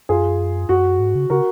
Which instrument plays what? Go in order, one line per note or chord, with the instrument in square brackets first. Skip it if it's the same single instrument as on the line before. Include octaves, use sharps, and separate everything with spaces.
[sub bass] F#2 [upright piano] F4 G#4
[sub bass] F#2 [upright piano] F#4
[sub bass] G#2
C#3
[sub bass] C#3 [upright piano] F#4 A#4